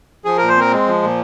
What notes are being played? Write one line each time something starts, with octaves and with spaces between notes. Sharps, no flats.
F3 G#4
A#2 A#4
C5
C4 A#4
G#3
F3
A#2